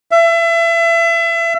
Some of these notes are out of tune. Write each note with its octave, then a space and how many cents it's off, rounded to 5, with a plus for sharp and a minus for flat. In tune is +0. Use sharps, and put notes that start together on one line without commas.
E5 +30